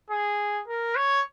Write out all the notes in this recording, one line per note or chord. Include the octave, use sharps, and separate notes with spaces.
G#4
A#4
C#5